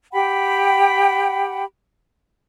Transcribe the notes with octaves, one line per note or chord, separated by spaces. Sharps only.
G4 F#5 G5 B5